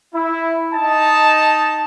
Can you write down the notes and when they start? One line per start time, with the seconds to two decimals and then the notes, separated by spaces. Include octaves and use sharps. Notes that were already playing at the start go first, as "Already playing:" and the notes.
0.15 E4
0.74 D#4 D#5 A5